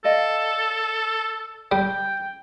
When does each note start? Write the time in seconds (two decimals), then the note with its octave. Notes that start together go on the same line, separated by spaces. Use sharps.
0.04 A4 D5 D#5 F5
1.72 G3 G5